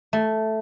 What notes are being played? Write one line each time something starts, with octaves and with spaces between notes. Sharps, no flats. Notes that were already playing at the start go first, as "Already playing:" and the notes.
A3